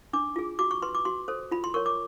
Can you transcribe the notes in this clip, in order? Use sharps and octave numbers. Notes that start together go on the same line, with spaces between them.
D4 D6
F4 G#4
F#4 D6
C#6
B4 C6
D6
F#4 C6
A4 C5
F4 B5
C6
A#4 C#5 C#6
D6